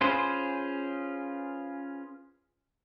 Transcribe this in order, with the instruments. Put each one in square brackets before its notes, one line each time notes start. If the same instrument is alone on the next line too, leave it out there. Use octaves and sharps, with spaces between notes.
[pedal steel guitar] C#4 F4 G#4 B4 C5